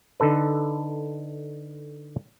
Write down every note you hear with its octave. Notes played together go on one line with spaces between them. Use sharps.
D3 D#4 A4 B4